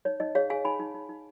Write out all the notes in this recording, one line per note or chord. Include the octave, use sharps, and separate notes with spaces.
D#4 C#5
D#4 D#5
G#4 C#5 F5
G#4 F5 G#5
D#4 G#5 B5
D#4
D#4
D#4